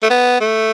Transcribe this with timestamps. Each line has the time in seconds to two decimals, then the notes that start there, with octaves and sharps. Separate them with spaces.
0.03 A3
0.10 B3
0.40 A3